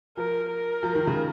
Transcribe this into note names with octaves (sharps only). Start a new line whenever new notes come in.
F3 A#4
A#4
F3
D#3
C#3